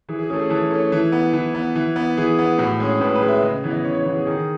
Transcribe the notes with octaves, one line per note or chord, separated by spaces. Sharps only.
E3 G#4
G#4
A3 C#4 G#4
G#4
E3 A4
A3 C#4
E3
B3
E3
B3
E3
B3
E3 G#4
B3
A2 F#4
G#3 C#4 G#4
A2 B4
B4
G#3 C#4
E5
C#3 D#5
E3 B3
D#5
C#3 C#5
C#5
E3 B3
G#4
D#3 G#4